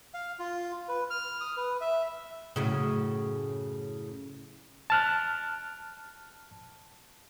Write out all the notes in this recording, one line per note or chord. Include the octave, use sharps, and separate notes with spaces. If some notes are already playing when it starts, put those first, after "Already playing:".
F5
F4
B4
F6
D#6
B4
E5
F#2 A2 C#3
A5 F6 F#6